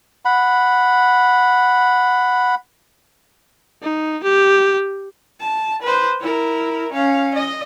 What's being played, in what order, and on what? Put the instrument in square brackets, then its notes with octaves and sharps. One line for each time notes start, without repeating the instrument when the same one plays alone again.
[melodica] F#5 B5
[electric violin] D#4
G4
[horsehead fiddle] A5
B4 C5
E4 A#4
C#4 F5
D#5